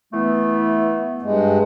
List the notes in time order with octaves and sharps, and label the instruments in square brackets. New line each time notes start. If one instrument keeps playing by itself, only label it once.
[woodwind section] E3 A3 B3
[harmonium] G2 G#3